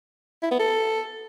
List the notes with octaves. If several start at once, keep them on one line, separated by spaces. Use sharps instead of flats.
E4
B3
A4